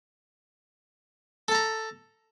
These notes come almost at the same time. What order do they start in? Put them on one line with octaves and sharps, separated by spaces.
A4 A5 A#5